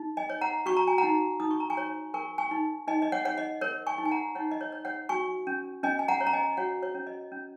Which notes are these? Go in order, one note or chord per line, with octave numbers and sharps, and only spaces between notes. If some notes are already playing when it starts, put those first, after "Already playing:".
Already playing: D#4
D#5 G#5
C#5
F#5 A#5
F#4 C#6
A#5
G#5
D#4 F#5 A#5
D#4 D#6
C#6
A#5
G#5 C#6
C#5
A#4 G#5 C#6
G#5 C#6
D#4
D#4 D#5 G#5
D#5
C#5 F#5
C#5 F#5
D#5
A#4 C#5
G#5 C#6
D#4
G#5
F#5 A#5
D#4 C#5 F#5
D#5
C#5
C#5
C#5 F#5
F#4 G#5 C#6
C#4
C#4 D#5 G#5
G#5
F#5 A#5
C#5
A#5
D#5 G#5
F#4 C#5 F#5
C#5
C#4
D#5
C#4